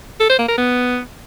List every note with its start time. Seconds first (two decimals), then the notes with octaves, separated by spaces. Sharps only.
0.20 A4
0.29 C5
0.39 A#3
0.48 A#4
0.58 B3